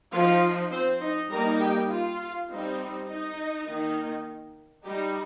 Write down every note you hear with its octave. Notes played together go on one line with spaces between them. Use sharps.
F3 D#4 F4 F5
C4 C5
D#4 D#5
G3 A#3 D#4 A#4 A#5
G4 G5
F4 F5
G3 C4 D#4
D#4 D#5
D#3 A#3 D#4
G3 D#4 G4